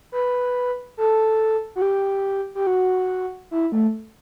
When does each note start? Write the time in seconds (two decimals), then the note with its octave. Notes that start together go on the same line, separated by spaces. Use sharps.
0.12 B4
0.97 A4
1.76 F#4
1.82 G4
2.55 G4
2.67 F#4
3.51 E4
3.72 A3